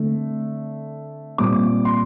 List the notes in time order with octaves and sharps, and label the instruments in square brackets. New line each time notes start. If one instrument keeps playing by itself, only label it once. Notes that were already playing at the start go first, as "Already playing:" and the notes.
Already playing: [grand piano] D3 A3 C4
A#2 G3 C4 D6
C6